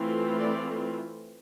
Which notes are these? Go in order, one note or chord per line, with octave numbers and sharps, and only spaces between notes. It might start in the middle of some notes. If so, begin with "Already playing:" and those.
Already playing: E3 A3 C4 F4
D5